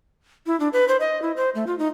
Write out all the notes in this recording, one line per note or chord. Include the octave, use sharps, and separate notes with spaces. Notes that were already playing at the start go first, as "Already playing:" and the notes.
E4
D4
B4
C5
D#5
E4
C5
A3
F4
D#4